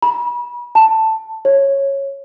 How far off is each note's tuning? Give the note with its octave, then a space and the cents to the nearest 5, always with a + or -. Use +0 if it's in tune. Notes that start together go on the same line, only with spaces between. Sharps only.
B5 -40
A5 +10
C#5 -10